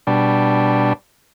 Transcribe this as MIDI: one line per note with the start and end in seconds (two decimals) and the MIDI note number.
0.07 0.93 47
0.07 0.93 55
0.07 0.93 62